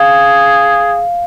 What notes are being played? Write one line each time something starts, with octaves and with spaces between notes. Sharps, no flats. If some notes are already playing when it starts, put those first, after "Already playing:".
Already playing: G#4 F5